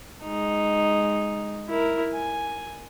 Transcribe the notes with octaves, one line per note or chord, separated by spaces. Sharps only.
G#3 D#4
E4 A#4
G#5